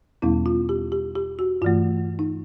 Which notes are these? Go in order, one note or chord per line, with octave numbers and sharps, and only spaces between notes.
E2 B2 G3 B3 E4
F4
G4
G4
G4
F#4
G2 E3 A3 F4
D#4